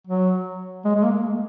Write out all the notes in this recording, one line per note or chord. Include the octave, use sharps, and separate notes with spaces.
F#3
G#3
G#3
A#3